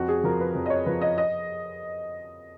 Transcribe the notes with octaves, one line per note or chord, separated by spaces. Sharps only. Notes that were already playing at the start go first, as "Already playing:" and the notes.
Already playing: F2 F#4
G#4
F3 A#4
B4
F2
D#5
C#5
F3 B4
D#5
D#5